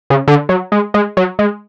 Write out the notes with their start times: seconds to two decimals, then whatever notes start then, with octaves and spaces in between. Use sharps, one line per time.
0.10 C#3
0.28 D3
0.49 F#3
0.72 G#3
0.94 G#3
1.17 F#3
1.39 G#3